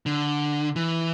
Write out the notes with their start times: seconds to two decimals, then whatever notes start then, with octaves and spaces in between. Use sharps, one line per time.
0.06 D3
0.76 E3